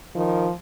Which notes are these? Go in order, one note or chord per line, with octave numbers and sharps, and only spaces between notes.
D#3 F3